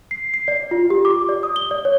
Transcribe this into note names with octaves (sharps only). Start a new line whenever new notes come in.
C7
C7
D5
F4
G4
D6
D5
D#6
G7
D5
C#5